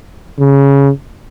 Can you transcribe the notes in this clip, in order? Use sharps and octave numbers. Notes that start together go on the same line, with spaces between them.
C#3